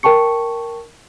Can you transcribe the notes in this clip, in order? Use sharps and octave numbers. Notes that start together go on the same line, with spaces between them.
A#4 G5 A5 C#6 C#7